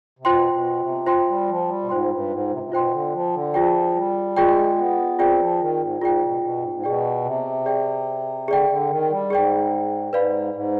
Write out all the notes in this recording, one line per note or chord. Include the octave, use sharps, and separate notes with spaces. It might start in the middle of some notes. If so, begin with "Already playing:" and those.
C3
B2 F4 C5 G5 C6
B2
C3
F4 C5 G5 C6
G3
F3
G3
B2
G#2 F4 C5 G5 C6
G2
G#2
C3
C3
B2 F4 C5 G5 C6
D3
F3
D3
F3 F4 G#4 D5 G5
G3
G#3 F4 G#4 D5 G5
B3
C4 F4 G#4 D5 G5
F3
D#3
G#2
G#2 F4 G#4 D5 G5
B2
B2
G2
G#2
G#2
B2 G#4 D5 G5
C3
G#4 D5 G5
D3 G#4 D5 G5
D3
D#3
G3
G#2 G#4 D5 G5
G#2 B4 D5 F5 B5
G#2